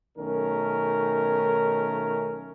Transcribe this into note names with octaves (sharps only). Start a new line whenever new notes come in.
B1 D#3 A3 C#4 A#4